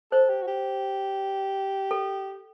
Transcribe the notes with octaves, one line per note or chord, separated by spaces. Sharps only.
A4 C5
G4
F#4
G4
A4